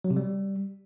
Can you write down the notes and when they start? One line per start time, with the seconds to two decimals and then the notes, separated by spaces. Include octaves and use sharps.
0.04 F#3
0.10 C3
0.16 G3